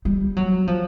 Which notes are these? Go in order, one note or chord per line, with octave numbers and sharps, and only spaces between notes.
G3
F#3
F3